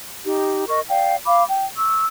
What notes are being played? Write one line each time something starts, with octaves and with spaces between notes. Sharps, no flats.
D#4 G4
A#4 D#5 C#6
D5 F5 G5
F5 B5 D6
G5
C#6 E6